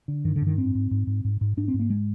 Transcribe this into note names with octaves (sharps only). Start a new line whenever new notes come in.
D3
G2 D#3
D3
G2
D#3
G#2 C4
G#2
G#2
G#2
G#2
G#2
G#2 D4
C4
G#2
A#3
G#3